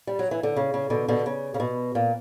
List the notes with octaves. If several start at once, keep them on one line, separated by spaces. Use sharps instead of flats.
G3
F#3
E3
D3
C#3
C#3
B2 D3
B2 D3
C#3
C#3
B2
A#2